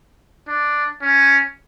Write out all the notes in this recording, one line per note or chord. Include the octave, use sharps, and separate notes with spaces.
D4
C#4